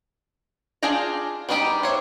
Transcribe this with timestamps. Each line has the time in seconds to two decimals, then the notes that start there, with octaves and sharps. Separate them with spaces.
0.83 D4 F4 G#4 G5 A#5
1.49 G3 B3 D4 D#4 G4
1.83 C5 C#5 E5